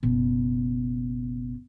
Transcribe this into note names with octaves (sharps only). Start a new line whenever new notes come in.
F#1 B2